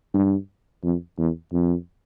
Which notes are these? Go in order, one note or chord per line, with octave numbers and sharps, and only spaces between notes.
G2
F2
E2
F2